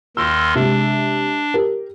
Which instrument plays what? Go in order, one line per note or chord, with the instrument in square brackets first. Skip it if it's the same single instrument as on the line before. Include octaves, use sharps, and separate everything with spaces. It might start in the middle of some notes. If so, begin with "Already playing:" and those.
[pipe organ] D#2 D#3 C6 [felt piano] E6
[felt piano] C3 G#3 [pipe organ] D4
[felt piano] G4 A#4